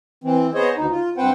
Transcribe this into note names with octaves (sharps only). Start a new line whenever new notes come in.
E3 C4
B3 G#4 C5 C#5 D#5
D2 D#4
F4
G2 C4 B4 C5 F#5 G5